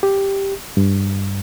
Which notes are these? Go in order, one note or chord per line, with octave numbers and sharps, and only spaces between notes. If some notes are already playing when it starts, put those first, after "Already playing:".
G4
G2